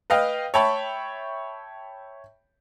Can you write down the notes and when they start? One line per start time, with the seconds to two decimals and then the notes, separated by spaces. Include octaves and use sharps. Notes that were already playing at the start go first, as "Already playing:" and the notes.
0.10 B4 D#5 F5 G5
0.54 C#5 E5 G5 A5 B5 C#6